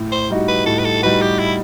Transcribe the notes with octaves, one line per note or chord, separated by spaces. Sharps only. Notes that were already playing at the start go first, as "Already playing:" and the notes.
Already playing: A2
C5
G3 D#4 F#4
B4
A2 A4
B4
A4
G3 D#4 F#4 B4
G4
E4